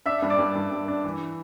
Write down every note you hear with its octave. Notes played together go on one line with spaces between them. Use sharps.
D4 E5 E6
G2
D5 D6
G2
G2
G2
D4
E3